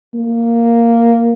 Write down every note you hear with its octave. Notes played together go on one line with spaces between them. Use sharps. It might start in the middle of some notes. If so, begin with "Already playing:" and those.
A#3